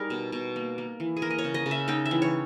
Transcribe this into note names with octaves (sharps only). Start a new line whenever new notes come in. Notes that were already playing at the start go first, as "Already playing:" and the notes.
Already playing: G3 D#4 G#4 A#4
B2
B2
A#3
A#3
E3
G#4
A#3 A#4
D#5
C#5
C#3
D#5
C#3
E5
D#4 G5
E5
E3
C#5